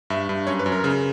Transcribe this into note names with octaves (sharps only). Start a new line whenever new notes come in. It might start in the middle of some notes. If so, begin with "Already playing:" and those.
G2 E5
G2
F#2 C#5
B4
F#2
A#4
C#3